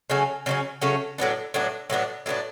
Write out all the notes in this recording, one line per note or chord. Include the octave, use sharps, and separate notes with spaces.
C#3 F#3 A3 C#4
C#3 F#3 A3 C#4
C#3 F#3 A3 C#4
A2 F#3 B3 D4
A2 F#3 B3 D4
A2 F#3 B3 D4
A2 F#3 B3 D4